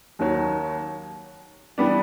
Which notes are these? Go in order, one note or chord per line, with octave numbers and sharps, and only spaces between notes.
D#2 D#3 F#3
E3 G3 B3 D4